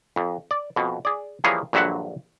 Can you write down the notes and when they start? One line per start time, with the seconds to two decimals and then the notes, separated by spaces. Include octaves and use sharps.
0.16 F2
0.51 D5
0.76 F2 B2
1.05 G#4 D5
1.44 E3 F3 G3 A#3 G#4 C#5
1.73 A#1 G2 D3 F#3 E5 F#5